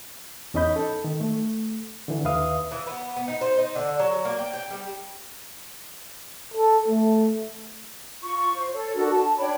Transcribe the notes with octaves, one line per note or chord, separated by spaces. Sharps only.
E2 C#4 D#4 D#5 B5 G6
A4
D#3
A3
D3 E3
D#2 B4 E5 F5 D#6
E3
B3
B3
D#4
C5
D#4
D3
F#3
A#3
G5
G5
G3
A4
A3
F4 C#6
C5
A4 C#5
D4 F#4 A4 A#4
A5
D4 C#5 G5 B5